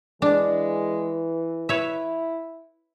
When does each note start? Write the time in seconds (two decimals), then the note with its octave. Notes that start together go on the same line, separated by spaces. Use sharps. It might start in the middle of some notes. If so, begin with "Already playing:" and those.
0.22 E3 G#3 D4
1.69 E4 B4 C#5 E5